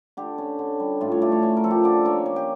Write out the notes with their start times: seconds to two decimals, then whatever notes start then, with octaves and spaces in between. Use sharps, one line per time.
0.17 D3 G4
0.38 C#4
0.59 D3
0.80 G3
1.01 A2 F4
1.12 C#5
1.22 A3 D5
1.32 C#5
1.42 C#4 C#5
1.57 A#4
1.64 F3 A4
1.71 G4
1.84 D3 D5
2.05 A#3 C#5
2.26 C#4
2.36 G4